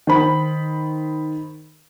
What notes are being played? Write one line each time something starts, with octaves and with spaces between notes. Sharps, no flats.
D#3 C5 B5